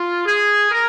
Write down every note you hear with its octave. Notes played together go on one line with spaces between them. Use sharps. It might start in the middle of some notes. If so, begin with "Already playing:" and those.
Already playing: F4
G#4
A#4